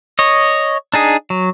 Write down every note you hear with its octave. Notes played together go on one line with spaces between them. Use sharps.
C#5 D#5
D4 D#4 G#4
F#3